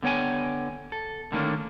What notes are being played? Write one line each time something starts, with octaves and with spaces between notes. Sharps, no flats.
D3 B3 C#5 G5 G#5
A4
D3 D#3 A3 A#3 C#4 D4